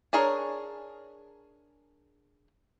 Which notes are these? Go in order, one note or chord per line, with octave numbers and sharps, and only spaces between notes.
D4 G#4 A#4 C#5